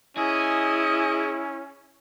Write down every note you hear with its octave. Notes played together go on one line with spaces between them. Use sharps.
C#4 E4 G#4 D#5